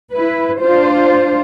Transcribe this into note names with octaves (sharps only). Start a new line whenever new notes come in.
E4 B4
D4 F4 C5